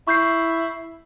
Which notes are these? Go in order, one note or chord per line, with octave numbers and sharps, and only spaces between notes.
E4 C#6 G6 C7